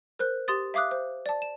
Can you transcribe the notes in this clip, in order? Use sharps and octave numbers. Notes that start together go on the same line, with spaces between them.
A#4 C5 F#6
G4 C6 D#6 A6
E5 F5 D6 D#6 F#6
C5
D5 A5
E7